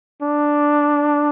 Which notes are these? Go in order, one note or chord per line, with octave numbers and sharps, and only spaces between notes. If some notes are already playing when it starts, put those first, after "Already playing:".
D4